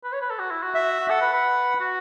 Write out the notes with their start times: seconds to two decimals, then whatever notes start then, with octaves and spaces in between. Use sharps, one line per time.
0.04 B4
0.13 C#5
0.22 B4
0.31 A4
0.39 F#4
0.51 E4
0.63 F#4
0.75 E5
1.00 F#4
1.10 A4 F#5
1.22 B4
1.33 B4
1.80 F#4